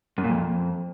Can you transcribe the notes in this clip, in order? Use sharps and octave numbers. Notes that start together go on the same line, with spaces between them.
F#2
A#2
F2